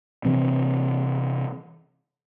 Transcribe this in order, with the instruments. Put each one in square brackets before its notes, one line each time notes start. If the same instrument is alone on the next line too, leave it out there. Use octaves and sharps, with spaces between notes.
[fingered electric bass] C3 E3 C4